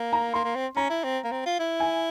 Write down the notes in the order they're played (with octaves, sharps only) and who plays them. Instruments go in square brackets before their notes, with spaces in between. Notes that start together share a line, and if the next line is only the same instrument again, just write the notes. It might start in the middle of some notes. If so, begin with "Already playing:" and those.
Already playing: [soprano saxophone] A#3
[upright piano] A#5
[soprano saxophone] A#3 [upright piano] C6
[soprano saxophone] A#3
C4
[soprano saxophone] C#4 [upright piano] A#5
[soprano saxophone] E4
C4
A#3
C4
F4
E4
[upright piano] G#5